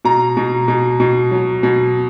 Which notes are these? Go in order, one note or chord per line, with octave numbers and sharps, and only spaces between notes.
B2 A#5
B2
B2
B2
F#3
B2